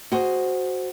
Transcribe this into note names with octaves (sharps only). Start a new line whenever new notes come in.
F#4 G#4 C5